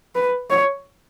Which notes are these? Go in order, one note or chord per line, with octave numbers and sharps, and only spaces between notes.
B4
C#5